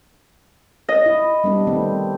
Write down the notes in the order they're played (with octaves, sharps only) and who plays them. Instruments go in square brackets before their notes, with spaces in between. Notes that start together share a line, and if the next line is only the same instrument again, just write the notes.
[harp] D#5
[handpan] E4
G3 B3 D4
D#3 A3 C4